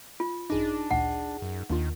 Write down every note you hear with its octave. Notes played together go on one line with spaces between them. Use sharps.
F4
G#1 F#2 D4 D#4 G#4 D6
A1 D2 A#2 F#5
F#2
D#2 D#3 A#3 D4 F4